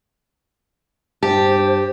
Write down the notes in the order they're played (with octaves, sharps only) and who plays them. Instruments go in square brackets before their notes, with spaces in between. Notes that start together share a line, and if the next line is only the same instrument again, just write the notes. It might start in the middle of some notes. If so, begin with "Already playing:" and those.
[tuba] G2 [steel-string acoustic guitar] G4 [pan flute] C5 [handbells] A5